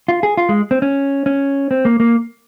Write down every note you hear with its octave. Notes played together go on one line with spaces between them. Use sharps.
F4
G#4
F4
G#3
C4
C#4
C#4
C4
A#3
A#3